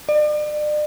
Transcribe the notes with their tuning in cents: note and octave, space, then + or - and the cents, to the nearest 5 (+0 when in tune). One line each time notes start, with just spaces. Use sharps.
D5 +40